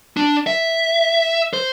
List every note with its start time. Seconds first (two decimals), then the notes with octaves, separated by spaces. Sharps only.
0.17 D4
0.47 E5
1.53 C5